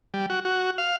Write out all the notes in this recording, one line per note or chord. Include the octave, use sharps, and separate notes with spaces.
G3
F#4
F#4
F5